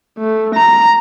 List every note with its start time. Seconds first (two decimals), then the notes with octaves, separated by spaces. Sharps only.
0.19 A3
0.55 A#5